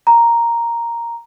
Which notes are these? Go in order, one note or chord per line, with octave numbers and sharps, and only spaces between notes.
A#5